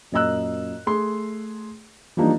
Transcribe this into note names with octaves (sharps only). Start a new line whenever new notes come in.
F#2 A#2 D#5 A#5 E6 F#6
A3 G#4 C6
E3 F3 G3 A#3 D4 D#4